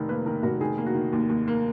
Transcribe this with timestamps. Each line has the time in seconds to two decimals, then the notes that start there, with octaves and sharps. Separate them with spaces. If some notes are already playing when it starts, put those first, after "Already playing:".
Already playing: F1 D#3
0.09 A#3 B4
0.26 D#3 A#4
0.43 F1 F#4
0.61 D#3 G#4
0.78 A#3
0.86 F#4
0.95 D#3
1.13 D#2
1.29 D#2
1.48 A#3